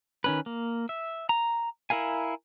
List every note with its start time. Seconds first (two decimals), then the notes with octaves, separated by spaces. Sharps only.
0.24 D#3 C#4 B4
0.46 A#3
0.89 E5
1.29 A#5
1.90 E4 A#4 F5 G#5